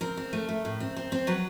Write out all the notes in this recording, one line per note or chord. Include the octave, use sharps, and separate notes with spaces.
C4 A#4
C4
A3
A3
A2
C4
C4
C4
F#3 B4